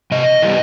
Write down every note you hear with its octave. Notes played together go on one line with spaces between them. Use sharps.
C3 D#5
E3 G3 B3